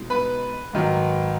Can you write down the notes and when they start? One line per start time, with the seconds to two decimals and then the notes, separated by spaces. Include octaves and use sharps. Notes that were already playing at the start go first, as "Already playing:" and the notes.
Already playing: B2 G#3 D#4
0.10 B4 B5
0.73 G#2 D#3 F#3